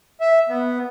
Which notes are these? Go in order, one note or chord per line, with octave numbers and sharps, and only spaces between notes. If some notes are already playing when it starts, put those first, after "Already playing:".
E5
B3